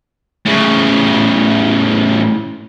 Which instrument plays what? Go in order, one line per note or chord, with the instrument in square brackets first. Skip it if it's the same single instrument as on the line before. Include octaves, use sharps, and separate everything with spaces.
[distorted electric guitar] A2 C#3